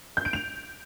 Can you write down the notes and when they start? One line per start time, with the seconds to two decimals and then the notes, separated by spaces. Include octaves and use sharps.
0.17 G6
0.25 D7
0.33 F7